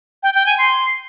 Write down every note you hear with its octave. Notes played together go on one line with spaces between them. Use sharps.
G5
G5
G#5
C6